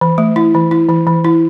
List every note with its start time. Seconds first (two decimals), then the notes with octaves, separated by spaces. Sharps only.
0.01 E3
0.18 A3
0.36 E4
0.54 E3
0.71 E4
0.89 E3
1.07 E3
1.24 E4